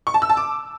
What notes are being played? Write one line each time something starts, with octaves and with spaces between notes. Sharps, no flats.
C#6
A5
E6
A5
D6